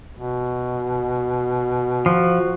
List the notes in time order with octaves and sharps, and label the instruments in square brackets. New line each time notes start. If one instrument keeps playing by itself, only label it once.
[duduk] B2
[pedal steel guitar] F3 [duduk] F#4